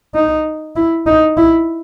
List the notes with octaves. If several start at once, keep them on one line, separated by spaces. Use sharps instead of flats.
D#4
E4
D#4
E4